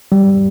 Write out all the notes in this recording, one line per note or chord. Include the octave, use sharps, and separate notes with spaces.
G3